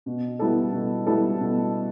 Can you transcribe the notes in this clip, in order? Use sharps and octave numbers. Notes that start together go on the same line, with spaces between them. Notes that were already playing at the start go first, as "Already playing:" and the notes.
B2
G3 B3 E4 A4
B2
G3 B3 E4 A4
B2